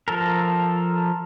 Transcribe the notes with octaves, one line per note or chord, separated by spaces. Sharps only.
F3 A4 A#4